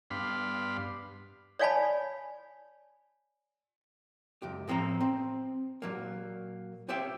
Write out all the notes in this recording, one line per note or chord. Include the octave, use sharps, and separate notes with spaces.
G2 B3 D4 F5 B5 C6
C#5 D5 F5 G#5 A5 B5
C#2 F#2 G4
A2 F3 C4 F5 A#5
C4
A#2 F#3 A#3
F4 G4 C5 C#5 E5 G5